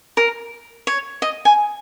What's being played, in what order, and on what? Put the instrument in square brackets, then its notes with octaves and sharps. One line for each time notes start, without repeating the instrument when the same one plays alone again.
[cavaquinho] A#4
C#5
D#5
G#5